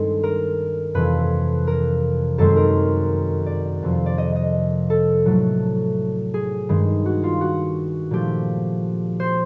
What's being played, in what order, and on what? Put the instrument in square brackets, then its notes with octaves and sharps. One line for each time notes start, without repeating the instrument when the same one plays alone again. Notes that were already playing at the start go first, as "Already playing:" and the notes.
Already playing: [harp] G2 D#3 G#3 C4 A4
A#4
F2 C3 E3 B4
A#4
F#2 D#3 G#3 C4 A4
A#4
D5
F2 C3 F3
D5
D#5
D#5
A4
A2 F#3 A3
G#4
G2 D#3 G#3
F#4
F4
F#4
A#2 F3 A3 G4
C5